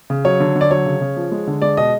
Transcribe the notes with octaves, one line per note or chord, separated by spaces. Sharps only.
C#3
F#3 C#5
D3
D3
D5
F#3 C#5
C#3
C#3
F3
G#3
D3
G#3 D5
B2 D#5